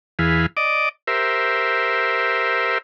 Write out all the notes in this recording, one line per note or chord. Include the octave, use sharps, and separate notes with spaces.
E2 E3 G#4 F5 B5
D5 D#5 D6
G4 A#4 C5 E5